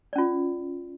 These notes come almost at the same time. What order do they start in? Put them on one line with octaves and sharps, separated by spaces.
D5 C#4 F4